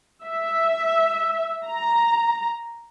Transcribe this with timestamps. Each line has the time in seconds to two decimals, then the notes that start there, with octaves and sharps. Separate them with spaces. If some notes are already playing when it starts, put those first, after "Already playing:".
0.24 E5
1.65 A#5